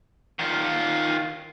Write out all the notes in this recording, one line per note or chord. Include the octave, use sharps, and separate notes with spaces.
D#3 F4